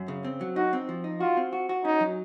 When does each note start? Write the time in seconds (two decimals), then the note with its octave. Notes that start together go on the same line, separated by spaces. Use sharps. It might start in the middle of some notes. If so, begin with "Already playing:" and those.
Already playing: F#2
0.08 C#3
0.24 C4
0.41 F#3
0.56 D#4 F#4
0.73 C4
0.89 F3
1.04 D#4
1.20 F4 F#4
1.37 C4
1.53 F#4
1.69 F#4
1.84 C#4 D#4
2.01 F#3